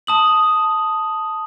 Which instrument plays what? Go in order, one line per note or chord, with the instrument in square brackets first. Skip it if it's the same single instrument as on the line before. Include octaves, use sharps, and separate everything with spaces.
[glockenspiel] A5 D#6 F#7